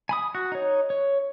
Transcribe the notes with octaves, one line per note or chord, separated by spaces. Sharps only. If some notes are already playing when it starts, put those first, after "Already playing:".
G#5 B5 D#6
F#4
D#4 C#5
C#5